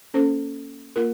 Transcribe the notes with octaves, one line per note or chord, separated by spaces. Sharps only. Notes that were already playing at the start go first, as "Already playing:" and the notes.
A#3 C#4 A4 C5
A#3 F4 A#4